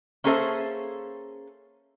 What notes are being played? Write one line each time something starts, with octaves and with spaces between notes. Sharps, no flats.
A#3 C#4 G#4 A4 C5 E5